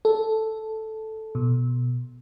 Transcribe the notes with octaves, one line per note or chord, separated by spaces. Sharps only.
A4
B2